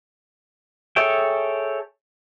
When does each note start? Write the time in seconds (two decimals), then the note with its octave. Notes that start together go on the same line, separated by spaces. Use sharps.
0.96 G#4 A4 C#5 E5 G5